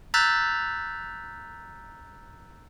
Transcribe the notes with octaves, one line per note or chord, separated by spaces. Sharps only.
A#5 E6 F#6 G6 A6 B6